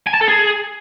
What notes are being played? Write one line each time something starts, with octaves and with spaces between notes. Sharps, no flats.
G#5
A5
A4
G#4